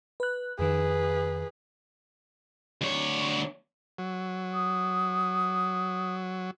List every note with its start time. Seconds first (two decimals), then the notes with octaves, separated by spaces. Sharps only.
0.20 B4 F#6
0.59 F2 D#3 G#4 B4
2.81 D2 C#5
3.98 F#3
4.53 D#6